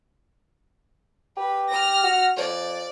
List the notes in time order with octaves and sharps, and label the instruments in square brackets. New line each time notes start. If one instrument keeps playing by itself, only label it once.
[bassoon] G4 [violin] B4
[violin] F6 A#6
[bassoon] F#4
[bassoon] F2 [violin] D5